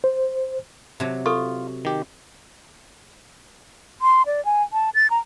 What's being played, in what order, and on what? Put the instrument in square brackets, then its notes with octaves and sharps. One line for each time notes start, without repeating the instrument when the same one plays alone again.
[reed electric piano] C5
[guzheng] C3 F#3
[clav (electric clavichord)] F4 [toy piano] A4 C#6
[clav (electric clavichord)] D#3 G4
[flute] C6
D5
G#5
A5
A6
A#5